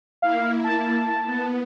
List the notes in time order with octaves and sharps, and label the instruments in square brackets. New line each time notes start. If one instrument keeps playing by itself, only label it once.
[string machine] A#3 E4 [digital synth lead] F5
[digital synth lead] A5
[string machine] B3